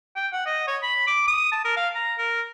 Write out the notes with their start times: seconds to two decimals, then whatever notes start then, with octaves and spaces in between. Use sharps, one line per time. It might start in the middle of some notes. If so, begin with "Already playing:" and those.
0.16 G5
0.33 F#5
0.46 D#5
0.67 C#5
0.82 B5
1.07 D6
1.27 D#6
1.52 A5
1.65 A#4
1.76 F5
1.95 A#5
2.18 A#4